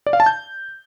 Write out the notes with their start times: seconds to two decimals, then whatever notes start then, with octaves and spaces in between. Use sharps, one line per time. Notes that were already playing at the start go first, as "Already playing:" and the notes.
0.07 D5
0.13 F5
0.20 A5
0.26 G6